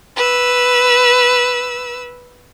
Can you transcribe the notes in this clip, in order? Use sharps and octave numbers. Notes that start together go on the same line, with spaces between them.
B4 E6